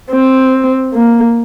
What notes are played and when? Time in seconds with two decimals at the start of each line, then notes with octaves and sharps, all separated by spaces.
0.11 C4
0.93 A#3